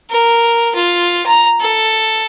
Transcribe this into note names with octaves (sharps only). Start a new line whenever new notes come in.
A#4
F4
A#5
A4